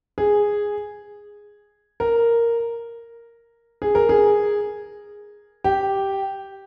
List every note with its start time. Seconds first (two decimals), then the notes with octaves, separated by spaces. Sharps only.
0.18 G#4
2.00 A#4
3.82 G#4
3.95 A#4
4.09 G#4
5.64 G4